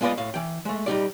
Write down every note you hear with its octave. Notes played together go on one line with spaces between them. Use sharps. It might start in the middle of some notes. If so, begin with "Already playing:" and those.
G#3 B3 F4 B4 D5 D#5
A2 F5
E3 G5
G#3 A3
G3 D#4 G4 D5